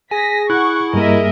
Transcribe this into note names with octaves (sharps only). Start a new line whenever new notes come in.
G#4 G#5 A#6 B6
E4 F#5 C#6 F#6
G2 G3 A#3 A#4 D#5 E5